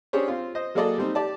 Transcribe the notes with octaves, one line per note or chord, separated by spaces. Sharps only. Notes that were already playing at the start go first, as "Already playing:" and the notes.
C#4 D4 G4 G#4 C5 C#5
C4 F4
C5 D#5
F#3 A#3 G#4 A4 D5 D#5
G3 C4 D#4
G4 D5 A5